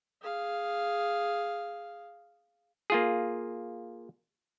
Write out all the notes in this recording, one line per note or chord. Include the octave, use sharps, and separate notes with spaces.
G#4 F5
A#3 F4 G#4